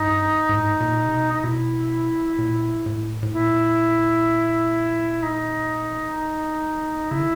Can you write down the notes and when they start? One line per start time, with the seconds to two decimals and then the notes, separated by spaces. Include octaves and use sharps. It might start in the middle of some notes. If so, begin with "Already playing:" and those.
Already playing: G2 D#4
0.49 G#2
0.56 A2
0.63 G#2
0.81 A#2
1.05 C3
1.13 B2
1.34 D#4
1.44 B2 E4
2.38 A#2
2.86 A2
3.23 A2
3.33 A#2 E4
5.23 D#4
7.11 C#3 E4
7.19 D3